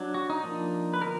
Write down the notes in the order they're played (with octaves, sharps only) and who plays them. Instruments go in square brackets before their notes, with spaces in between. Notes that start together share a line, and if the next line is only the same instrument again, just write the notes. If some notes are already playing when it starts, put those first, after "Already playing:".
Already playing: [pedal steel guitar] F#3 D4
F#4
D#4
F3 A#3 D4
B4
D3 F3 B3 A#4